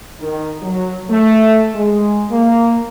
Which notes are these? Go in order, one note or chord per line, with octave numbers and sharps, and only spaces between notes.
D#3
F#3
A3
G#3
A#3